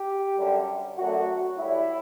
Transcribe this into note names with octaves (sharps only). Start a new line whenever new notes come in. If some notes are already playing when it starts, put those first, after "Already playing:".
Already playing: G4
F#2 D3 G3
F#2 D3 F#3 A3 F#4
A2 G3 E4